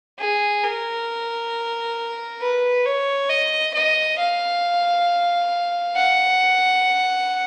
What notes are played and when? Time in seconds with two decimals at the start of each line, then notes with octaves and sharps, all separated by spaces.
0.19 G#4
0.63 A#4
2.41 B4
2.86 C#5
3.30 D#5
3.74 D#5
4.19 F5
5.97 F#5